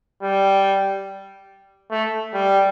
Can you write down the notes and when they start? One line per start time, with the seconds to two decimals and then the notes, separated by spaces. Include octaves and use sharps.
0.23 G3
1.91 A3
2.34 G3